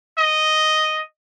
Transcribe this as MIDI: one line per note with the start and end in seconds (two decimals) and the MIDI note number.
0.19 1.02 75